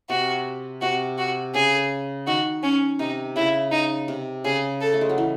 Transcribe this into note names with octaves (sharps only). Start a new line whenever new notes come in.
C3 F#4
C3 F#4
F#4
C#3 G#4
D#3 F#4
C#4
C3 D#4
C#3 E4
D#4
C3
C#3 G#4
A4
A3
G#3
F#3
E3